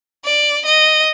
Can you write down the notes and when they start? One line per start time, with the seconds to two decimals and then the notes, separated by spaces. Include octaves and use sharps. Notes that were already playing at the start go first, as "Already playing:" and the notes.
0.25 D5
0.65 D#5